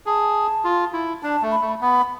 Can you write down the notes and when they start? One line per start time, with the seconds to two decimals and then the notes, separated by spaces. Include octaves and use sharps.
0.06 G#4 A5
0.64 F4
0.93 E4
1.23 D4 A5
1.42 A3
1.52 B5
1.61 A3
1.81 B3 B5